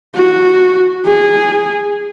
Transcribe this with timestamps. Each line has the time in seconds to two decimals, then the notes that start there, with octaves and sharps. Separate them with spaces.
0.15 F#4
1.06 G#4